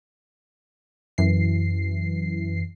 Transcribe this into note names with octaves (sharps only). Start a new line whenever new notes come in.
F#2 E3 C7